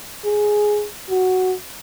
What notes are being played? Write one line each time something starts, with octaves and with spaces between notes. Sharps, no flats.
G#4
F#4